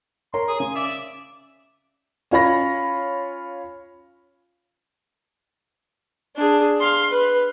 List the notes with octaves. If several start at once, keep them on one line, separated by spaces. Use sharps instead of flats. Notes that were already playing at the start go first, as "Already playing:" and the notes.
A#4 C#5 A#5 C6
G#4
C#3 G#5
D5 E5
C#4 F4 C#5 B5 A#6
D4 G#4
F5 C6
B4